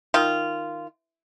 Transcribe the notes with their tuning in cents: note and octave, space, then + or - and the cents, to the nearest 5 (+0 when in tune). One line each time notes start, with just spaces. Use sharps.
D#3 +0 F4 -15